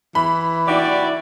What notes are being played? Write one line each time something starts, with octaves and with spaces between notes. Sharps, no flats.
E3 B5
E4 F#4 G4 D5